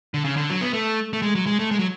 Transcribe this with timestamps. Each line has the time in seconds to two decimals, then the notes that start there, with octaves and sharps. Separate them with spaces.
0.14 D3
0.25 C#3
0.37 D3
0.50 F#3
0.61 B3
0.73 A3
1.13 A3
1.22 G#3
1.35 F#3
1.46 G#3
1.59 A3
1.71 G#3
1.79 F#3